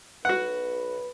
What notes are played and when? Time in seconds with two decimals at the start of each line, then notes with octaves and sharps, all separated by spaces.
0.25 B1 F#4 B4 F#5